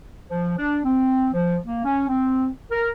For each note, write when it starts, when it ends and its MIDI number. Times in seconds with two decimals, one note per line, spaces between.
0.29 0.54 53
0.59 0.79 62
0.85 1.28 60
1.34 1.57 53
1.66 1.83 58
1.85 2.06 61
2.09 2.50 60
2.72 2.90 70